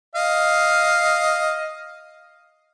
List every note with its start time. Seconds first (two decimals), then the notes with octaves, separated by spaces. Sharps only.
0.15 D#5 F5